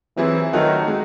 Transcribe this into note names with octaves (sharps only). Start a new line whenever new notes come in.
E3 F#3 C4 E4 G#4
D#3 F#3 A3 D#4 F#4 A4
G#3